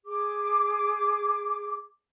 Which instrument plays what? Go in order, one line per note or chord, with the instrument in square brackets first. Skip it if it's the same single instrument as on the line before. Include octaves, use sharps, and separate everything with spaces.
[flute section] G#4 D6